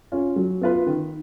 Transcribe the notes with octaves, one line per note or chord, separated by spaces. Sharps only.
C#4 F4
F#3
B3 F4 B4
D#3